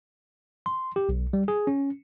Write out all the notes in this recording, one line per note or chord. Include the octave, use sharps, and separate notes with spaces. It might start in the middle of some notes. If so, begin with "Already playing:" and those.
C6
G4
B1
G3
G#4
C#4